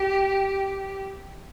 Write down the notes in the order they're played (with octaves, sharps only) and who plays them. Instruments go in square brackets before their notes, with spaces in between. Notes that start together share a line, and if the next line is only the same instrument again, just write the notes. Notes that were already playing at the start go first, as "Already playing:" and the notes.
Already playing: [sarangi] G4